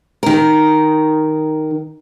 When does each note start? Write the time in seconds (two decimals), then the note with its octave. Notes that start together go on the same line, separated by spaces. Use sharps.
0.23 D#3 A#4